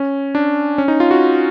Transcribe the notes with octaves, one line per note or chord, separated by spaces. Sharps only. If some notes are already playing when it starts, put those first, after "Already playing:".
Already playing: C#4
D4
C#4
D#4
F4
F#4